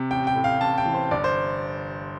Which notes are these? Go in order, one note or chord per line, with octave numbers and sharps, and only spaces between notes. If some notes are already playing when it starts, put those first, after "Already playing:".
Already playing: C3
A1 G5
G5
A2
F5
A1 A5
G5
E3
C5
G1 D5
C5